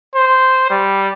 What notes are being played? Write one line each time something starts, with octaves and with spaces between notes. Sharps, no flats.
C5
G3